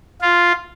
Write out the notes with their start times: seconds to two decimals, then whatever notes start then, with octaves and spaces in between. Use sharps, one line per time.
0.22 F4